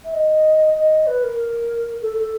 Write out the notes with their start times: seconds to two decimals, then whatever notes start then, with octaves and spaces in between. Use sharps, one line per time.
0.04 E5
0.13 D#5
0.76 D#5
1.07 B4
1.24 A#4
2.02 A4
2.17 A4